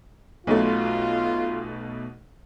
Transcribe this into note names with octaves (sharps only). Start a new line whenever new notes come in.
B1 B2 A3 F4